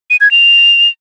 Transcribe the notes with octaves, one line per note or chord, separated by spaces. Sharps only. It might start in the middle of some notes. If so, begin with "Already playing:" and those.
D#7
G#6
F7